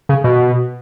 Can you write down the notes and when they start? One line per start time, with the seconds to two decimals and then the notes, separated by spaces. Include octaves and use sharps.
0.09 C#3
0.24 B2